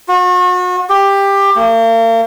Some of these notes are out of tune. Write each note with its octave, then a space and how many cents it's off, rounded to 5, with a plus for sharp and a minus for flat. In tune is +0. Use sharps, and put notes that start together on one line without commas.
F#4 -35
G4 +15
A#3 -40